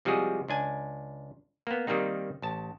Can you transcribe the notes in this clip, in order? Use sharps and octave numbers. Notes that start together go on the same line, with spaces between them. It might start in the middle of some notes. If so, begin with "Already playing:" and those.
C3 F3 G3 G#3 F#4 G#4
C#2 D4 G#5
A#3 B3
D#3 G3 A#3 C4 D#4
A1 A5